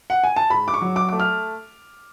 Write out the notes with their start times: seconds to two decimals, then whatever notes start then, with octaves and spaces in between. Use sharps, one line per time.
0.10 F#5
0.24 G#5
0.36 A5
0.50 G#2 B5
0.68 D6
0.74 C#6
0.81 F#3
0.96 D6
1.09 A3 D6
1.20 F6